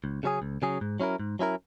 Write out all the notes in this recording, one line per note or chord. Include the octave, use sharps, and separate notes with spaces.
C#2
C#3 F#3 C#4 G#4
C#2
C#3 F#3 C#4 G#4
G#2
F#3 C#4 E4 A#4
G#2
F#3 C#4 E4 A#4